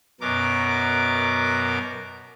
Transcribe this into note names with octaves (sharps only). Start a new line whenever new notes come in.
F#2 B2 A#4 D6